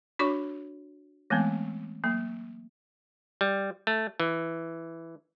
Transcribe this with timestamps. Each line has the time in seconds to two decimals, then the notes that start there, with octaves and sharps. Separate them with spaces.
0.19 D4 F#4 C#5 C#6 D6
1.30 E3 G#3 A3 B3 C4
2.04 F#3 A#3
3.41 G3
3.87 A3
4.20 E3